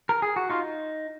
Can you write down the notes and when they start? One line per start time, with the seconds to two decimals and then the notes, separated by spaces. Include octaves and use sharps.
0.09 A#4
0.22 G#4
0.36 F#4
0.50 D#4 F4